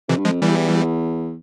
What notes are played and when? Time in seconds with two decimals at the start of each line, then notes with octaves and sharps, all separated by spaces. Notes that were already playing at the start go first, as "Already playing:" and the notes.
0.08 F2 C3 E3
0.18 G2
0.25 F2 F3 G#3
0.42 E2 E3 G3